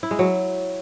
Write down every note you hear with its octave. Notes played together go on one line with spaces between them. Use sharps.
E4
G#3
F#3